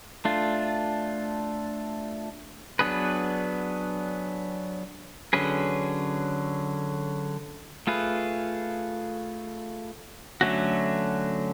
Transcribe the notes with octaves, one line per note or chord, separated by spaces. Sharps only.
A3 D4 F4
F#3 B3 D4 G#4 B4
D3 F#3 C#4 G#4 B4
A3 F4 G#4 B4
D3 F#3 A3 C#4 F#4